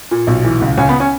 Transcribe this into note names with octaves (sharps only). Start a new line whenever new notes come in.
A#2
B1
E3
C#2
C#2 C#4
B3
C#4